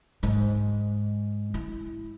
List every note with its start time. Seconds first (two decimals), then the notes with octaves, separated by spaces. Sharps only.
0.23 G#2 G#3
1.54 E4